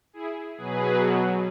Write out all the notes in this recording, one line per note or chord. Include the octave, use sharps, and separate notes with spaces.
E4 G#4
B2 F#3 G#4 B4